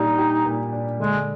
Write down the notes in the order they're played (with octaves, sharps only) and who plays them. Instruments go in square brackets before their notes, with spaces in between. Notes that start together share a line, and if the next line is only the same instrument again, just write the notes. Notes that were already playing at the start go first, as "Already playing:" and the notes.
Already playing: [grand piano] A#2 G3 D4 [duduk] D#4
[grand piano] G4
A#2
D4
[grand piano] D3 [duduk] G#3